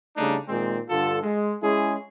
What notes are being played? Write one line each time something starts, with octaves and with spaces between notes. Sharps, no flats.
C#3 G3 A3 D4 D#4
A#2 D#3 G#3 C4
G2 D3 F4 A4
G#3
G#3 C#4 E4 G#4